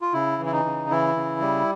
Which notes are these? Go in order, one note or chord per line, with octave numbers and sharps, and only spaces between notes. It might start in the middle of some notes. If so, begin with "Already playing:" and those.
F4
C#3 E4
E3
E4
D#4
C#3
E3 E4
C#3
G3